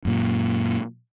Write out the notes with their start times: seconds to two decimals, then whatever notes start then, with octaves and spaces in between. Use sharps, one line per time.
0.05 F#2 A#2